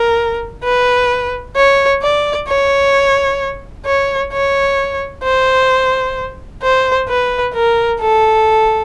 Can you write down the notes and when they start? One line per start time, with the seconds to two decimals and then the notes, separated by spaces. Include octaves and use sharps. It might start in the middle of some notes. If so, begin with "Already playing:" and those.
Already playing: A#4
0.64 B4
1.56 C#5
2.02 D5
2.48 C#5
3.86 C#5
4.32 C#5
5.23 C5
6.62 C5
7.09 B4
7.54 A#4
8.00 A4